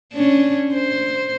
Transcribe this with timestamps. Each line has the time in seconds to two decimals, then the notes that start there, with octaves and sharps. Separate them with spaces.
0.14 C#4 D4
0.74 C5